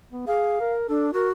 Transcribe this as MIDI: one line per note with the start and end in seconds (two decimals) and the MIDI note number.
0.12 0.25 59
0.27 0.60 68
0.27 0.73 77
0.60 0.88 70
0.89 1.11 62
0.89 1.07 69
1.13 1.32 66
1.13 1.28 70